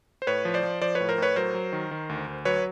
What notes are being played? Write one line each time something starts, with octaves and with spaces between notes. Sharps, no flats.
C5
A2 B4 C#5
F3
C5 D5
F3
F3 C5 D5
B4 C#5
A2
A#4 C5
A2 B4 C#5
F#3 A#4 C5
F#3
D#3
D#3
D2
D2
F#3 B4 C#5